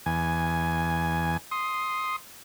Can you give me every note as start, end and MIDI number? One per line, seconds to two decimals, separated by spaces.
0.06 1.37 40
0.06 1.37 80
1.51 2.16 84
1.51 2.16 87